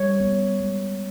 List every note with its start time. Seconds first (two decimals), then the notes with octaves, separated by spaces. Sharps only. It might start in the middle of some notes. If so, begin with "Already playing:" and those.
Already playing: G3 C#5
0.20 B3
0.60 G#3